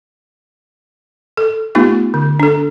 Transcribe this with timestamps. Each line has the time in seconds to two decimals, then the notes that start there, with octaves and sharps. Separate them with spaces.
1.37 A4
1.75 A3 B3 D#4 F4 G4
2.14 D3
2.40 D4 A4